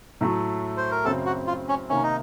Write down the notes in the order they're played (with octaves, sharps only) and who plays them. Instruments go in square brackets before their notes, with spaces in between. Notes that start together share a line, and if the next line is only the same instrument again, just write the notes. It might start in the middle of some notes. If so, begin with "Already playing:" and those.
[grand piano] A2 F#3 A3
[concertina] C5
A#4
[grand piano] F#2 C#3 F#3 C4 [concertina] A4
[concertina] F#4
F4
C#4
[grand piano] C3 D#3 A#3 [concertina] C#4
[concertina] D#4